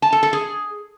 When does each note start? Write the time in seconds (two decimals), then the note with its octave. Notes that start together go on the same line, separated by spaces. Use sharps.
0.02 A5
0.13 A4
0.23 A4
0.33 G#4